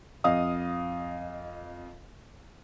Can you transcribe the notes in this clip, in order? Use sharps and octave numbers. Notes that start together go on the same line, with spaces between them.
F2 D#5 F5 D#6